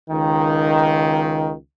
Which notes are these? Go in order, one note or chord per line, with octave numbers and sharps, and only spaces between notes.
C#2 D#3